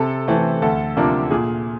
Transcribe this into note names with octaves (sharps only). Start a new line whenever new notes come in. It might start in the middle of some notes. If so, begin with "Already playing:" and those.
Already playing: C3 A4
E3 A3 C4
D2 A4
C3 F3 A#3 D4
A#2 G#4